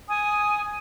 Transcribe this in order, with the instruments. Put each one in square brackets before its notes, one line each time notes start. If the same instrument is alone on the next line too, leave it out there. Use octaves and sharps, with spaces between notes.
[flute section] G#5 D#6